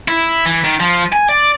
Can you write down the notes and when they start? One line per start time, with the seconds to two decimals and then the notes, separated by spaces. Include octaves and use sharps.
0.08 E4
0.46 E3
0.64 D#3
0.80 F3
1.13 G#5
1.29 D5